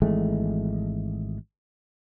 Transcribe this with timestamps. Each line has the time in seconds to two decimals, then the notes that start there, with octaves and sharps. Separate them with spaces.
0.02 G#1 E3 G#3 A3